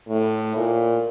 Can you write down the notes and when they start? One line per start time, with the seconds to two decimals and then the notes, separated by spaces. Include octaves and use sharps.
0.09 A2
0.57 A#2